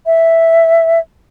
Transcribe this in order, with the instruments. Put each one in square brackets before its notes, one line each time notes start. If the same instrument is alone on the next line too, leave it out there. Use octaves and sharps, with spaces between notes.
[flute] E5